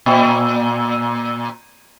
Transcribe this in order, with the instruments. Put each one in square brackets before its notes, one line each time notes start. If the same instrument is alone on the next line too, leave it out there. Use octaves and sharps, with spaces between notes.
[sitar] A#2